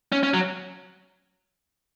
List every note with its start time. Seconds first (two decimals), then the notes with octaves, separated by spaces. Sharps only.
0.12 C#4
0.23 C#4
0.34 F#3